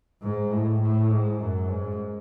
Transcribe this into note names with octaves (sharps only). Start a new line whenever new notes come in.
G#2
A2
A2
G#2
F#2
G#2